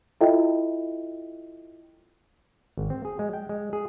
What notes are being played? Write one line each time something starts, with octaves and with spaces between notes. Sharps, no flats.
E4 F4 A4 D#5 E5 G5
G#1
C4
G#4
G#3
G5
G#3
G#4